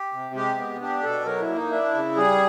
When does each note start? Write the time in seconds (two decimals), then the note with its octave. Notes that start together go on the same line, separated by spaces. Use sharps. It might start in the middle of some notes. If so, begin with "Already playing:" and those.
Already playing: G4
0.13 C3
0.35 G#3 G4
0.57 B3
0.81 D4 G4
1.03 B2 A4
1.25 F#3 A#4
1.41 E4
1.49 A#3
1.55 D#4
1.71 D4 E4
1.94 C#3
2.16 G3 G#4